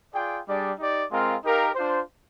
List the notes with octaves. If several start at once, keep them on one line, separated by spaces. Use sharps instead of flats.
F4 G#4 D5 G5
G3 D4 G#4 D5
D#4 G4 D5
G#3 C4 F4 A#4 F5
D#4 G4 A#4 F5
D4 F4 C5